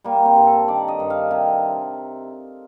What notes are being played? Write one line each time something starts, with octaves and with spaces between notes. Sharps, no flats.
G3 A#3
C4
G2
A4
D#3 D5
D#5
G2
F5
C3